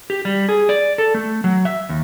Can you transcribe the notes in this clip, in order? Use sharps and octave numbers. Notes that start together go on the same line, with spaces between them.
G4
G3
G#4
D5
A4
A3
F#3
E5
D#2